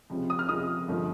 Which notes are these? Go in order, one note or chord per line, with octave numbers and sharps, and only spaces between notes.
C#2 C3 F3 G#3
D#6
F6
C#2 C3 F3 G#3 D#6
G1 F3 G#3